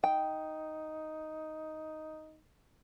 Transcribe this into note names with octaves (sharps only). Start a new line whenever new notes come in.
D#4 G5